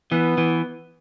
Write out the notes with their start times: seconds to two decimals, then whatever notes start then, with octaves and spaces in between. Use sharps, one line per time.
0.12 E3 B3
0.38 E3